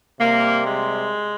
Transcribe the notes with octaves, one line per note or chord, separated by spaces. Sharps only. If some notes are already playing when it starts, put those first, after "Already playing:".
C3 G3 A#3
G#3